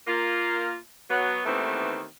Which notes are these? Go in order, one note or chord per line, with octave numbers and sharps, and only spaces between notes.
A#3 F4
F#3 B3
D#2 D#3 E3 A3 B3 C4